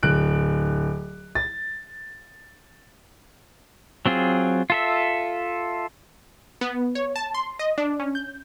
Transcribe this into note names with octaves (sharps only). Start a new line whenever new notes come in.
D1 F#6 D7
A6
F#3 C4 F4 G#4
F4 A4 E5
B3
C#5
A5
C6
D#5
D4
C#4
G6